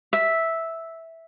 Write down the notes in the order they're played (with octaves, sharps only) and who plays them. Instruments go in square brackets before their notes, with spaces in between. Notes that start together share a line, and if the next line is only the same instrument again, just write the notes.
[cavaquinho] E5